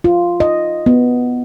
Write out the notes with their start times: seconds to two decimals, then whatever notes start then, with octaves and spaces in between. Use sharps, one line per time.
0.04 F4
0.40 D#5
0.86 B3